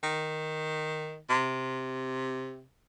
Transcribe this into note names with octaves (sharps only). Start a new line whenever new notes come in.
D#3
C3